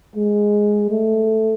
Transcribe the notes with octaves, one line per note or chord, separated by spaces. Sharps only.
G#3
A3